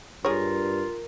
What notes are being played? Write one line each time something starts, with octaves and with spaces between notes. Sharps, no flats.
G2 F4 G#4 A#4 C#5 F6